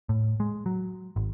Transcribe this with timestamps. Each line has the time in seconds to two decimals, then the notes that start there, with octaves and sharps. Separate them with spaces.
0.09 A2
0.40 G#3
0.66 F#3
1.16 G#1